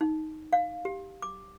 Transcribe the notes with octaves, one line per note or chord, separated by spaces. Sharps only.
D#4
F5
G4
D6